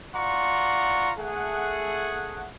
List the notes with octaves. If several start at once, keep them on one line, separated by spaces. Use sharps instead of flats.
F4 D5 F#5 A#5 C6 C#6
A3 G#4 F#5